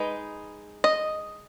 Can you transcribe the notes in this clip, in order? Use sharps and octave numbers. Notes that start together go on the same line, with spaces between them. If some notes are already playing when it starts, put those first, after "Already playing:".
Already playing: G#3 D#4 B4
D#5